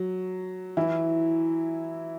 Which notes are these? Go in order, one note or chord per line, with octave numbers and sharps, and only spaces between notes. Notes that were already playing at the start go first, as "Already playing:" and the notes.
Already playing: F#3
E3 E4